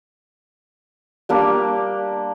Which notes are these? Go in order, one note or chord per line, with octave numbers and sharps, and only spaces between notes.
G3 A#3 D4